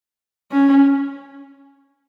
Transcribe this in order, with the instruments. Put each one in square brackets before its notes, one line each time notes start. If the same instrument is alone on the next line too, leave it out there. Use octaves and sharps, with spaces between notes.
[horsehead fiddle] C#4